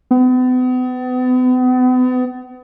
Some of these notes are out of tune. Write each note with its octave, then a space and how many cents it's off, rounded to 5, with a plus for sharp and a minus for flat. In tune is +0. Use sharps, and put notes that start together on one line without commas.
B3 +40